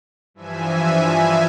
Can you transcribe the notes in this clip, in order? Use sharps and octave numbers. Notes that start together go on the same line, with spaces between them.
G2 E3 F3 E5 G#5